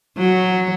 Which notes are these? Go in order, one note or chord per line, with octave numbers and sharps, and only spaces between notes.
F#3